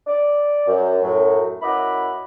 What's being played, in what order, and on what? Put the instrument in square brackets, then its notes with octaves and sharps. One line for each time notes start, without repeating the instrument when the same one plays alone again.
[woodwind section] D5
F#2
F#2 A2 F#3
F#2 E4 D#5 F#5 B5 D6